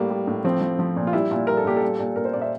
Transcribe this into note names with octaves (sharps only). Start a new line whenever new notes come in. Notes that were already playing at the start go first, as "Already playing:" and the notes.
Already playing: A2 G3 A#3
G3
A2
F3 C4
F3
F3
A#2
F4
G3 E4
A#2 F4
G3 A#4
A4
A#2 G4
A4
G3
A#2
A#2 A#4
C5
A#2 D5
E5